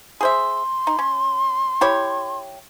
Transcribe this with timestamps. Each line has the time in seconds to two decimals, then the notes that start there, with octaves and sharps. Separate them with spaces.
0.21 G#4 C5 E5 C6
0.87 D#4
0.99 C#4
1.81 E4 G4 C#5